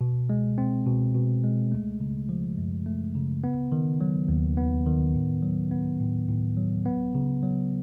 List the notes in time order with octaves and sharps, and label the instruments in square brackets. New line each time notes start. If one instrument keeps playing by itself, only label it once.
[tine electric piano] B2
G#3
C4
B2
B2
G#3
A3
C#3
F3
F#2
A3
C#3
B3
D#3
F#3
D#2
B3
D#3
A2
F#3
B3
A2
A2
F#3
B3
C#3
F#3